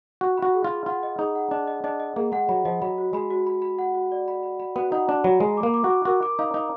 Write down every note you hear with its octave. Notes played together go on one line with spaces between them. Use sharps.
F#4 F#5
B5
F#4
G#4
F4
G#4
F4 F#5
D#5
D#4 G#4
F#5
D4 D#5
D#5
D4 D#5
D#5
A#3 G#4
G#3 F#5
F#3 B5
F3 D#5
F#3 B5
F#4
G#3 B5
F#4
B5
B5
F#5
F#4
D5
B5
B5
B5
B3 F#4
D#4 F#5
D4 F#4
F#3 B5
G#3 A#5
D6
A#3
D6
F#4
D6
F#4 A#4
D6
D#4 F5
D#4 F5